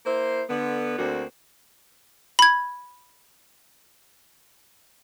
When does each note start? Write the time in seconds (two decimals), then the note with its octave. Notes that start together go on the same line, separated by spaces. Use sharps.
0.06 A#3 E4 C5
0.49 D3 B3
0.99 D2 D3 A#3 C4 F#4
2.39 B5 G#6